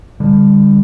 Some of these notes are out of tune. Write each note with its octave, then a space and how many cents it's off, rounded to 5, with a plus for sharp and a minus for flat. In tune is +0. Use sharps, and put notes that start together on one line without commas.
D3 +0 G3 +30